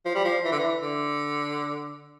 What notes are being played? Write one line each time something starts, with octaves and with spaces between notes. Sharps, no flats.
F3
G3
F3
E3
D3
E3
D3